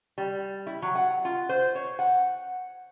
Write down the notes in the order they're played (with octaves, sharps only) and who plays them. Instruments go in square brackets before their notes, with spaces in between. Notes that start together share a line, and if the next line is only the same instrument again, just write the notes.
[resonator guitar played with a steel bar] G3
E4
F#3
F#5
F4
C5
C#5
F#5